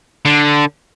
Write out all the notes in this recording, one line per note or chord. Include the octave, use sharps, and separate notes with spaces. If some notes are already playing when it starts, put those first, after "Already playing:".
D3